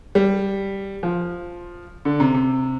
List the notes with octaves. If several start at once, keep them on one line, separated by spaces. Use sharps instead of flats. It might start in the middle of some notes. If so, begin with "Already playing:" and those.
G3
F3
D3
C3
C3